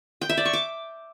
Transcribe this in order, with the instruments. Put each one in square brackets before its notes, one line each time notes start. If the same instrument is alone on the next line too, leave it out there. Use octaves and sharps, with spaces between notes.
[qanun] G5
E5
D5
C#6
D6